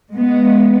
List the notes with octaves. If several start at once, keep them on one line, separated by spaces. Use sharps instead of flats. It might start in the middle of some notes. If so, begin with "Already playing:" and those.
G#3 B3